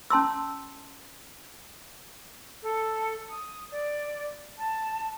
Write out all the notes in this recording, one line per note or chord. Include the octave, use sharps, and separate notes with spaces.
C#4 A5 C6 E6
A4
D#6
D5
A5